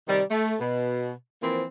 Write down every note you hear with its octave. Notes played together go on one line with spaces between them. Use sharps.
C3 D#3 G3
A3
B2
E3 F3 A#3 C4